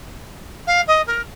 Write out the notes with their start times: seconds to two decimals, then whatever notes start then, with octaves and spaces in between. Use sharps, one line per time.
0.66 F5
0.87 D#5
1.06 A#4